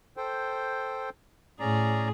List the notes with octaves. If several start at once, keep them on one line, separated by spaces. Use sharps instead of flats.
A4 C5 G5
A2 C#4 G#4 D5 A#5